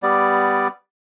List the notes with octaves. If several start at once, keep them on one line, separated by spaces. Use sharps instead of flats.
G3 B3 D5